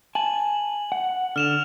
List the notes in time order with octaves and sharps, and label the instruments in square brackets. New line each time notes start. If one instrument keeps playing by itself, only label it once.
[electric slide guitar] G#5 A5 [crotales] F#7
[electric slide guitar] F#5
[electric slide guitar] D3 [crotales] F6 E7 F7